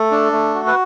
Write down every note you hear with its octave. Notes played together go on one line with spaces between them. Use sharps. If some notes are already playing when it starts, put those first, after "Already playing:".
Already playing: A3 A4
D4
A3
F#4
B4